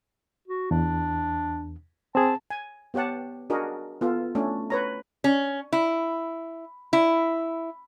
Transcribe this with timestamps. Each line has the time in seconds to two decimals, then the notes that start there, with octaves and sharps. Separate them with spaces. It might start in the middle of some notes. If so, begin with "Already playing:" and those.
0.48 F#4
0.71 E2 D4
2.15 C4 G#4 A5
2.50 G#5
2.94 B3 G4 C#5 F#5 A5
3.50 D4 F#4 G#4 A#4 D#5
4.01 B3 F4 A4
4.35 A3 C#4 D4
4.70 B4 C#5 A#5
5.24 C#4
5.73 E4
6.93 E4